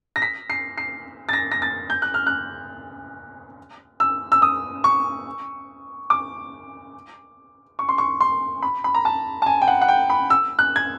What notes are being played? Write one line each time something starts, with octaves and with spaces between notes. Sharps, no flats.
A#6
B6
C7
C7
A6
A#6
A#6
A6
G6
F#6
F6
F#6
E6
E6
D#6
C#6
D6
C#6
C6
C#6
C6
B5
B5
A#5
A5
A5
G#5
G5
F#5
F#5
G5
B5
E6
F#6
G#6